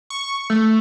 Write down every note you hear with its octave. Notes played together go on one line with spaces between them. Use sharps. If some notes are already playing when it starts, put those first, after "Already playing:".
C#6
A3